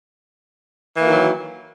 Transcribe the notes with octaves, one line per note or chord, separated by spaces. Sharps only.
D#3 E3 F#3 A#3 F#4